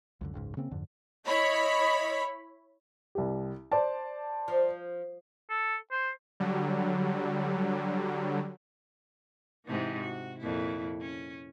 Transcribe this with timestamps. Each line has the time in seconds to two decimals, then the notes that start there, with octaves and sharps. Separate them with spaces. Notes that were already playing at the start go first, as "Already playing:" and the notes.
0.21 C#2 F#2 D3
0.34 F#1 C#2 G#2
0.57 C#3 A#3 C4 C#4
0.71 F2 G#2 D3
1.26 E4 C#5 D#5 B5
3.15 C2 G4
3.72 C5 D5 A5
4.48 F3
5.49 A4
5.91 C5
6.40 D3 F#3 G3
9.65 G#2 C3 E3
10.01 F#4
10.39 F2 A#2 E4
11.01 C#4